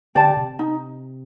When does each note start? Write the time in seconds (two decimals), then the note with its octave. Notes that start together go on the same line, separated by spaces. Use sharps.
0.15 D3 G4 D5 A5
0.37 C3
0.59 D#4